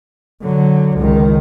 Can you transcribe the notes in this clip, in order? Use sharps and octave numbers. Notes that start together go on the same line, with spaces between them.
D3 F#3
C#2 D#3